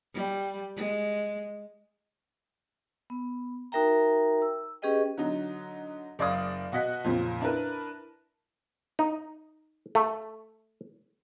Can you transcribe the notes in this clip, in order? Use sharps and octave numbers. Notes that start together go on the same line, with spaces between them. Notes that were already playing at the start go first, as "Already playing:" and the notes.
G3
G#3
B3
D#4 F#4 A#4 E5 G5 A#5
E6
C#4 G4 G#4 B4 D#5 G5
D3 F#3 D#4
F#1 D5 F5 D#6
B2 F#4 D#5 F#5 B6
F2 A#2 C#3
D4 E4 A#4 B4
D#4
A3